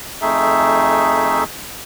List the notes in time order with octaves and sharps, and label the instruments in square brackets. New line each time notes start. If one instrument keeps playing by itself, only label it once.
[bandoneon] F2 A3 D#4 G#4 E5